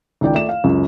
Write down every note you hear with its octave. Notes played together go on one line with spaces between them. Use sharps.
C#2 D#3 D5 G5
A3 D5 E7
F5
C#2 F#2